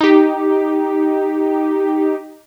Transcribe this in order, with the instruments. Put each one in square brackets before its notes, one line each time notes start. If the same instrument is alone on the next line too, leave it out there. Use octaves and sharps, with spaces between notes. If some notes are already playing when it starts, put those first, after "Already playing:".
[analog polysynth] D#4 G4